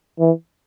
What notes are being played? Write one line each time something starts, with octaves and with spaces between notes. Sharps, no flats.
E3